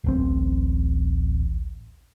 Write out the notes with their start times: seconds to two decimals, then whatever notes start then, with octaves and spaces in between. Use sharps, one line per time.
0.04 D1 A1 C4